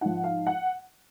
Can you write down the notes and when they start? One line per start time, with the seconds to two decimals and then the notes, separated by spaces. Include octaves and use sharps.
0.01 G#2 F3 F#5
0.24 F5
0.47 F#5